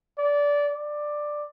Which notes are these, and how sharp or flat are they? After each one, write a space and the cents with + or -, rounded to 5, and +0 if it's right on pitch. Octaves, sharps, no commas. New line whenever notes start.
D5 -20
D5 +10